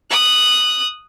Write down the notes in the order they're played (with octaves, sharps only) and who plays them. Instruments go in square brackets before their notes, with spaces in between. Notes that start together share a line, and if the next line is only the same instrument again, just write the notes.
[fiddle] D#6 F#6